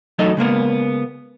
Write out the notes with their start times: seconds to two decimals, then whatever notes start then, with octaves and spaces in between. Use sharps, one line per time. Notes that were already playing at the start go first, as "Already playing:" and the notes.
0.19 E3 F#3 A3 D#4 A4 D#5
0.37 C#3 G#3 A#3 B3